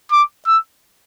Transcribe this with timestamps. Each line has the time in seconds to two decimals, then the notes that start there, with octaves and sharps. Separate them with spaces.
0.12 D6
0.47 E6